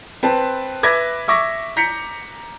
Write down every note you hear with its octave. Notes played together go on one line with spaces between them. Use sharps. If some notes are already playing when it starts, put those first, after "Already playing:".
C4 B4 A5
B4 E5 D6 G#6 A#6 B6
E5 C#6 D6 A#6
A#5 G6 B6 C#7